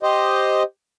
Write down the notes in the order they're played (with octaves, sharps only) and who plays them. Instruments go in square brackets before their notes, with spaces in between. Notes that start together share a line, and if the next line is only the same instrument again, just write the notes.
[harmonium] G4 C5 D#5